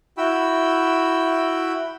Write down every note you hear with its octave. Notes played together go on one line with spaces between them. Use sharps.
E4 F#4 G5 B5 E6